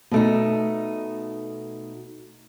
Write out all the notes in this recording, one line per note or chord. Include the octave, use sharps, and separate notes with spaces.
B2 A3 D#4